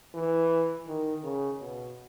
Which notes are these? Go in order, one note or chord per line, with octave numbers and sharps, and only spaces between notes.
E3
D#3
C#3
B2